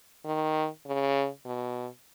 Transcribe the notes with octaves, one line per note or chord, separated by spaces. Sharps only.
D#3
C#3
B2